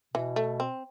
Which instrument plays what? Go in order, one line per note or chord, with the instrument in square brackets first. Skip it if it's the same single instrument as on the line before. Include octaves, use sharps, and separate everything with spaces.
[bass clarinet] B2 [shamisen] E3
[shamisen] A3
C4